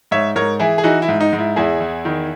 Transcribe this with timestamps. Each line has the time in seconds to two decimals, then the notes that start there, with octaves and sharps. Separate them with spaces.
0.11 G#2 C#5 E5
0.36 G#2 A#4 C#5
0.59 E3 E4 G#4
0.78 G#4
0.84 E3 D#4 F#4
1.02 E4
1.08 G#2
1.20 D#4
1.33 G#2
1.39 E4
1.56 E2 E4 G#4
1.80 E2
2.05 D#3